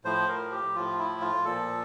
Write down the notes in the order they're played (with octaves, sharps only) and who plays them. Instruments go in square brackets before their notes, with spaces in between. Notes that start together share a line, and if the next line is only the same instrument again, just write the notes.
[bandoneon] A2 F3 C5
A#4
G4
A2 F3 F4
E4
F4
A#2 F3 A4